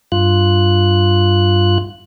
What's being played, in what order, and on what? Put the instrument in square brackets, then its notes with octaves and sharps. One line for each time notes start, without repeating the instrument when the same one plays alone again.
[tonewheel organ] G2 F4 F#6